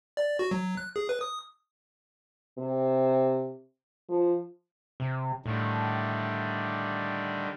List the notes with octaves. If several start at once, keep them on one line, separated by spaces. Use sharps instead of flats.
D5
F#4
F#3
F#6
G#4
B4
D#6
C3
F3
C3
A2 D3 D#3 G3